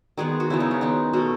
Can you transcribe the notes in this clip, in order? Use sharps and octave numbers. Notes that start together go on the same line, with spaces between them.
D#3 G#3 B3 G#4
F#4
C#3 F#3 B3 E4
D#4
C#4
D#3 G#3 B3 D#4
B2 A3 F#4